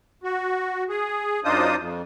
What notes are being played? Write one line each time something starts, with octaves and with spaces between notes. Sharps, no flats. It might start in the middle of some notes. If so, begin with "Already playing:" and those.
F#4
G#4
F#2 D4 D#4 F4 C5 D#6
F2